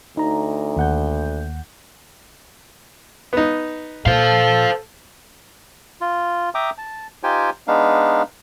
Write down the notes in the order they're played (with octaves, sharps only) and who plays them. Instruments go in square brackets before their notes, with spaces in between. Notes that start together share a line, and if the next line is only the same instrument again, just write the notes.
[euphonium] D2 [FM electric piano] D#4 A#5
[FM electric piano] D#2 F#5 G6
[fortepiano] B3 D#4
[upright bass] A#2 [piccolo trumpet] A4 [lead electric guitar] C5 F5
[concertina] F4
E5 G5 A#5 D6 D#6
A5
D#4 F4 G4 C5 G5 G#5
G#3 B3 D4 D#4 F5